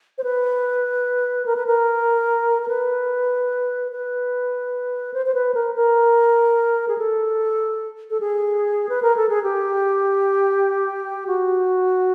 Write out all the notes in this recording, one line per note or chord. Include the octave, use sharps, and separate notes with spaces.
C5
B4
A#4
B4
A#4
A#4
B4
B4
C5
C5
B4
A#4
A#4
G#4
A4
A4
G#4
B4
A#4
A4
G#4
G4
F#4